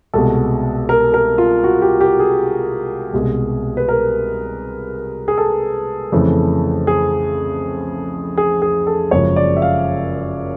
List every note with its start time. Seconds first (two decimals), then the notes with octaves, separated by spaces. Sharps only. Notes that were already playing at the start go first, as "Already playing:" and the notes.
0.13 C2 B2 G#3 A4
0.89 A#4
1.14 A#4
1.38 F4
1.64 F#4
1.82 G4
2.01 G4
2.20 G#4
3.13 C2 B2 G#3
3.77 B4
3.89 A#4
5.28 G#4
5.38 A4
6.12 F2 C#3 E3 A3
6.87 G#4
8.38 G#4
8.62 G#4
8.87 A4
9.11 F#1 F#2 C#3 F3 G#3 C#5
9.36 D5
9.57 E5
9.62 F5